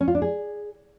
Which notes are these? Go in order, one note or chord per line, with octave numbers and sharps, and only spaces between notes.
C#4
F4
D4
G#4